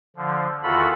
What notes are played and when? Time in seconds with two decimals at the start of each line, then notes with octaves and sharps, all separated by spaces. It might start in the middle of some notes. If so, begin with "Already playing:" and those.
0.16 D3 F3
0.63 E2 D#3 F4 F#4 A4 B5